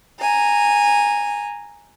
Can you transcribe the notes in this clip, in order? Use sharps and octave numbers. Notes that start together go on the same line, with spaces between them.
G#5 A#5